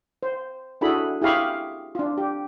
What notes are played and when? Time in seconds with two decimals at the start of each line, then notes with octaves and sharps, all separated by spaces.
0.23 C5
0.81 D4 E4 F#4 G#4 A4 B5
1.22 E4 G4 G#4 F5 B5 C#6
1.95 D4 F4
2.18 G4